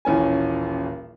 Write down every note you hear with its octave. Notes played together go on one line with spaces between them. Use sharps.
D#1 A1 C#4 G#5